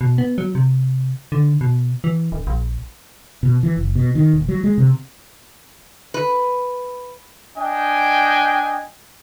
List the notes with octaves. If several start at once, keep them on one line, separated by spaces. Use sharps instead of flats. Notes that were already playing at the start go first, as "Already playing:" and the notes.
B2
B3
F#3
C3
D3
B2
E3
D1
A#1
B2
E3
F#1
B2
D#3
D#1
F#3
G#3
C3
B4
D4 D#5 G5 G#5